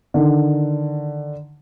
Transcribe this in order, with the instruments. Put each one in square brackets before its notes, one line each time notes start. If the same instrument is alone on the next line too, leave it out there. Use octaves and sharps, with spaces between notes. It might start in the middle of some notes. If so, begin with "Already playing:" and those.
[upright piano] D3 D#3